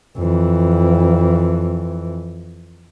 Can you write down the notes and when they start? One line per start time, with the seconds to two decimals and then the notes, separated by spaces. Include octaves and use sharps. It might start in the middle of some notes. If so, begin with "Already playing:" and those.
0.17 F2 E3